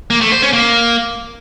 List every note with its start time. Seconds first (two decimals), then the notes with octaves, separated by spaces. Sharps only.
0.10 A#3
0.21 A3
0.32 C5
0.42 C#4
0.53 A#3